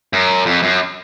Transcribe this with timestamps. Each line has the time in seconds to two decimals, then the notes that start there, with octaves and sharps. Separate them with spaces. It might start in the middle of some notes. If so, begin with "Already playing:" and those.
0.13 F#2
0.46 F2
0.63 F#2